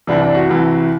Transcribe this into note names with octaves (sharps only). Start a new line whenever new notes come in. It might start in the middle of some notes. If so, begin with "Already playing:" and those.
C2 C3 E3 D4
D4
F#4
C2 C3 E3